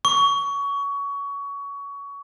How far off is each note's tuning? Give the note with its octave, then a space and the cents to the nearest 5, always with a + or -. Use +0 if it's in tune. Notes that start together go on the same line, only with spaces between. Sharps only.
C#6 +25